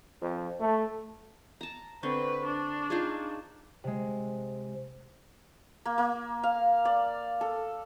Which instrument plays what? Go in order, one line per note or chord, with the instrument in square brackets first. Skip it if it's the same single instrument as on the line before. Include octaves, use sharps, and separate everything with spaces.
[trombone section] F2
A3
[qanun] A5 A#5
[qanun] D3 C4 [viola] B4 [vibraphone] C#6
[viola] D4
[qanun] D#4 F4 G#4
[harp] C3 G#3
[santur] A#3
A#3
F5
D5
A4